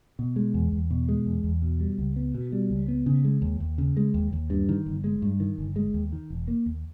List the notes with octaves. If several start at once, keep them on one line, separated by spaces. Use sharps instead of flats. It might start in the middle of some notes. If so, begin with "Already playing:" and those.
B2
G#3
E2
E2
B2
G#3
E2
E2
B2
G3
C#2
B3
B2
G3
C#2
B3
C#3
G#3
D#2
D#2
C#3
G#3
D#2
D#2
G2
D#3
G1
G#3
G2
D#3
G1
G#3
D#2
D#3
E1
A#3
D#2